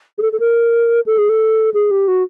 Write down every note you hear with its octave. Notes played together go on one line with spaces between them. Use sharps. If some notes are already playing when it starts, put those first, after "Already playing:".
G#4
A4
A4
A#4
A4
G#4
A4
G#4
G4
F#4